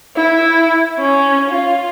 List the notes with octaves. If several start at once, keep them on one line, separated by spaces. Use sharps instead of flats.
E4
C#4
F4